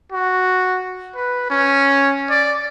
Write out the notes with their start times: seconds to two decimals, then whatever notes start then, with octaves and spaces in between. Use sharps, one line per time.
0.13 F#4
1.15 B4
1.50 C#4
2.30 D5